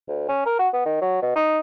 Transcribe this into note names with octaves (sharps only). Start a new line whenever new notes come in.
D2
C#4
A#4
F#4
B3
D#3
F#3
B2
D#4